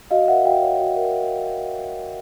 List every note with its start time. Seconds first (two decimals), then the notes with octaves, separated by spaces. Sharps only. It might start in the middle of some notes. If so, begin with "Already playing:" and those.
0.11 F#4 D#5 F5
0.28 A#4 E5 F#5
0.45 F#4 F5 G5
0.62 C#5
0.79 F#4
0.96 A#4